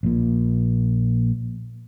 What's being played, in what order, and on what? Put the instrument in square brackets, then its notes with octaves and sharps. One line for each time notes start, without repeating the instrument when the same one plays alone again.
[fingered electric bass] A#1 A#2